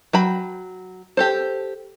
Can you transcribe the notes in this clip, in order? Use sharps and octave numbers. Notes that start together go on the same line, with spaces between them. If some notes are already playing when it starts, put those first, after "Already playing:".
F#3 G5 B5
G4 A4 C5